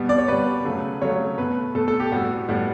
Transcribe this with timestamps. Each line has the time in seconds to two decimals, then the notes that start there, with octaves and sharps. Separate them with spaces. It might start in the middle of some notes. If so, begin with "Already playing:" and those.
Already playing: B2 G3 B3
0.09 D5
0.18 C#5
0.28 B2 G3 B3 B4
0.65 C#3 F#3 A3
1.02 C#3 F#3 A3 C#5
1.38 B2 A3 B4
1.75 B2 A3 A4
1.88 A4
2.00 G4
2.12 A2 G3 B3 F#4
2.48 A2 G3 B3